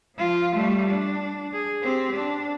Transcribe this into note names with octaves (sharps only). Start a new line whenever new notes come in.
F3 F4
G3 A3
D4
G#4
C4 G4
D4